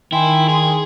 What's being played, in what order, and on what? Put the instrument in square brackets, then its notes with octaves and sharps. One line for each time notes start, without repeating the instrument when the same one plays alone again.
[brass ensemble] D#3 [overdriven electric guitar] E4 [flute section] G5 G#5 C6
[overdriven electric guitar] G#4